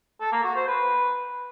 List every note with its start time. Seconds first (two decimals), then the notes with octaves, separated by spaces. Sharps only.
0.20 A4
0.32 A#3
0.44 F#4
0.56 C5
0.68 B4